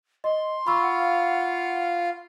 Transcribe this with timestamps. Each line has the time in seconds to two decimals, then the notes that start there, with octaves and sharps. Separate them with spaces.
0.24 D#5 C6
0.67 F4 F5 B5 C#6 E6
0.82 F#5